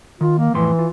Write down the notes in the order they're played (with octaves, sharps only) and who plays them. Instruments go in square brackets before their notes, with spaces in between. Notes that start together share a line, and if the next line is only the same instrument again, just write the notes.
[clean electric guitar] D#3 [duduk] F4
[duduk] A#3
[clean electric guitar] F2 A2 C6 [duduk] E3
[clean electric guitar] F4